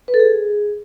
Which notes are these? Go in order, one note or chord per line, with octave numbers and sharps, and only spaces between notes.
B4
A4
G#4